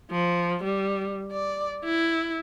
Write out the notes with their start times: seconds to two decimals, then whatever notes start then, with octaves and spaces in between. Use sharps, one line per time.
0.11 F3
0.64 G3
1.31 D5
1.85 E4